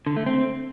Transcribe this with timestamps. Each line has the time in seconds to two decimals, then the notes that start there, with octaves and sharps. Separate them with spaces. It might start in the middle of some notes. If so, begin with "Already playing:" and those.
0.06 D3
0.16 A3
0.26 C4